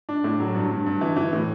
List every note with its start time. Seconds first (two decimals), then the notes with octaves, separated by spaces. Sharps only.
0.09 D4
0.24 A2
0.40 F#3
0.55 G2
0.71 G2
0.86 G2
1.01 E3
1.16 E3
1.33 A2